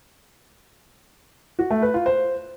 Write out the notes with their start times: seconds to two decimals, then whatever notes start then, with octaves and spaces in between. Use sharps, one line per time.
1.59 F#4
1.70 A3
1.82 B4
1.94 F4
2.06 C5